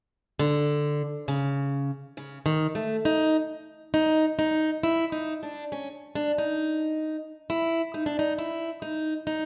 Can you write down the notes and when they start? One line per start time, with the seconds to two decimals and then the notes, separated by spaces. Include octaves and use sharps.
0.39 D3
1.28 C#3
2.17 C#3
2.46 D#3
2.75 A3
3.05 D#4
3.94 D#4
4.39 D#4
4.83 E4
5.12 D#4
5.43 D4
5.72 C#4
6.15 D4
6.38 D#4
7.50 E4
7.94 D#4
8.06 D4
8.19 D#4
8.38 E4
8.82 D#4
9.27 D#4